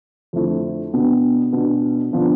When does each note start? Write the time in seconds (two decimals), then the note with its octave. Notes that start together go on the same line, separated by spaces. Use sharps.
0.33 F2 D3 A3 C4 E4
0.93 B2 B3 D4
1.52 B2 B3 D4
2.11 D3 F3 B3 D4